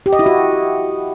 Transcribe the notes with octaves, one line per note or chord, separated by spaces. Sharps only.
G4
D#5
E4
F#4